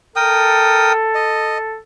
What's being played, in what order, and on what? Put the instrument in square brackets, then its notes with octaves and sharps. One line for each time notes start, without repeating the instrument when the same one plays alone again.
[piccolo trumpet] A4 [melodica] A#4 G5 D#6
[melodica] D#5